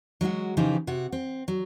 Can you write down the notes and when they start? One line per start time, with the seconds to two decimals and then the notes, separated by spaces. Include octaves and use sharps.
0.21 F#3 G#3 F4 F#4
0.57 C#3 E3 F3 D#4 G4
0.87 C3 F#4
1.12 C4
1.48 F#3